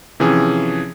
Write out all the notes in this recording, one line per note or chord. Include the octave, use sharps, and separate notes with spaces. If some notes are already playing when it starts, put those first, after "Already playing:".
C3 E3 F3 C#4 G#4